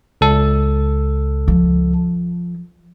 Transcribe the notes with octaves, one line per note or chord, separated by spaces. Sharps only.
C#2 A4
F3